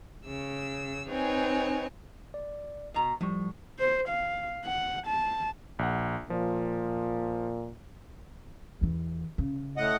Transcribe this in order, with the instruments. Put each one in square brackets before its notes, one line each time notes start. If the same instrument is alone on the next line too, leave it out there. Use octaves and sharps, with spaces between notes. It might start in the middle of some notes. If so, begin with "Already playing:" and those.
[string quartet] C#3 E6
C4 D#4 B4 C#5 G#5
[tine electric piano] D5
[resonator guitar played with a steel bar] B2 A#5
[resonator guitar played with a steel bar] A2 [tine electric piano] F3 G3 C#6
[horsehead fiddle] C5
F5
F#5
A5
[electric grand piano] A#1 F#5
[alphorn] A#2 [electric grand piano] F3
[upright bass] E2 E3
C#3
[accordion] A2 D#5 F#5